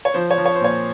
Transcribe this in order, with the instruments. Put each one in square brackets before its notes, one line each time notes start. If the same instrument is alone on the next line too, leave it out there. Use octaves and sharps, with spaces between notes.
[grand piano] C#5
F3 C5
C#5
F3
C#5
C5
A#2 C#5